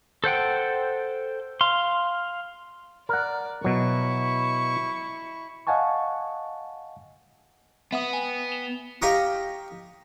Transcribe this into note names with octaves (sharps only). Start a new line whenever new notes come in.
A4 C5 F#5 G5
F5 C6
A#4 D5 F#5
B2 F#3 E4 C#6
D#5 F5 F#5 G#5 A5 C#6
B3 E5 F#5 D#6
G5 G#5
E7 F7 G7
G4 D#5 F5 A#5 C#6 D#6